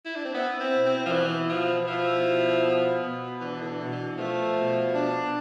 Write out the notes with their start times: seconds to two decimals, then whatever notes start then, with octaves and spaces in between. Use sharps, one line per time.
0.06 E4
0.16 D4
0.25 C4
0.34 B3 E4
0.60 C4
0.73 B2
0.86 C4
1.06 F3
1.11 E3 B3
1.50 B2 F3
1.87 F3 E4
2.26 B2
2.64 B3
3.03 B2
3.40 E3 D4
3.61 D3
3.66 E3
3.79 B2
3.92 E3
4.18 F3 A3
4.56 B2
4.95 D4